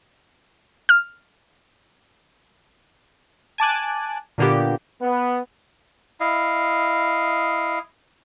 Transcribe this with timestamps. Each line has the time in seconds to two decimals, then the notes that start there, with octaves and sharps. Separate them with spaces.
0.89 F6
3.58 G#5 A5 D6 F#6
4.38 A#2 D3 A#3 B3 G4
5.01 B3
6.20 E4 D#5 F5